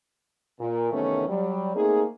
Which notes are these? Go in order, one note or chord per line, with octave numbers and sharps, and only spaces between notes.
A#2
E2 C3 D#3 A3 B3 C#4
F#3 G3
A3 A#3 C4 D#4 G#4